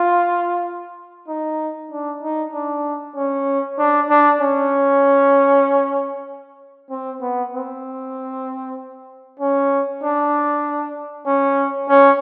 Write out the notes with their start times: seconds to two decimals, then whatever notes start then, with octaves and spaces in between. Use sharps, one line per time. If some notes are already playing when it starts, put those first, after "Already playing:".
Already playing: F4
1.28 D#4
1.92 D4
2.23 D#4
2.53 D4
3.16 C#4
3.79 D4
4.10 D4
4.40 C#4
6.90 C4
7.22 B3
7.53 C4
9.40 C#4
10.03 D4
11.26 C#4
11.89 C#4